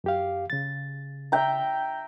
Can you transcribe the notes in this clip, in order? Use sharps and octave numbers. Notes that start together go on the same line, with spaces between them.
F#2 G4 F5
C#3 A6
E5 G5 A#5